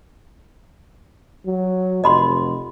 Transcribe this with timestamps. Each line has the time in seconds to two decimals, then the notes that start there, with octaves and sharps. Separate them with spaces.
1.46 F#3
2.04 F1 D#5 B5 C6